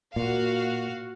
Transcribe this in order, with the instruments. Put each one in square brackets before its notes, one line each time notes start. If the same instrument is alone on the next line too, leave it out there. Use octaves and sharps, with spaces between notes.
[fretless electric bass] A#2 [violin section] F#4 F5